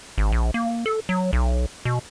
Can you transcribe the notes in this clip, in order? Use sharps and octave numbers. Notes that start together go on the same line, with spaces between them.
G#1
A#1
A#3
A4
F#3
B1
B2